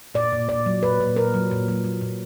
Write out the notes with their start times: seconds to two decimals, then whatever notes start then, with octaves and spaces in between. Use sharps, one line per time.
0.15 A#2 D5
0.32 A#2
0.49 A#2 D5
0.66 F#3
0.83 A#2 B4
1.01 A#2
1.16 A#2 A#4
1.34 F#3
1.51 A#2
1.68 F#3
1.84 F#3
2.01 A#2